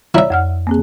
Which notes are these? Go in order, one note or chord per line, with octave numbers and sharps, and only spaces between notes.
E4 C#5 D5 E5 A#5
F2 F#5 F6
A#3 C4 G#4